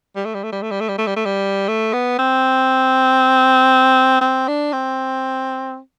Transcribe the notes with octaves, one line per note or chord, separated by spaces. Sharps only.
G3
A3
G3
A3
G3
A3
G3
A3
G3
A3
G3
A3
G3
A3
B3
C4
C4
D4
C4